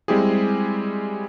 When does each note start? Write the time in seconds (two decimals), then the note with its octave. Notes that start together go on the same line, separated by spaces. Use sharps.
0.08 G3 G#3 C4 E4 G4 G#4